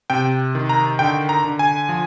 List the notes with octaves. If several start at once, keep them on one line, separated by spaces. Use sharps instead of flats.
C3 G5
D#3
A#5
D3 G5
A#5
D3
G#5
F3